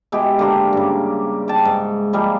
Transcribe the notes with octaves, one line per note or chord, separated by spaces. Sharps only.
B2 G#3 E4 G4
D3 A#3 G4 C5
G2 C#3
G5 A5
G#2
F3 G3 G#3 A#3